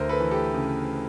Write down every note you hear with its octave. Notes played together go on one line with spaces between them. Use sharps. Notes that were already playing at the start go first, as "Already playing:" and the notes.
Already playing: D2 A#4 C5
A4 B4
E3
G4 A4
C#3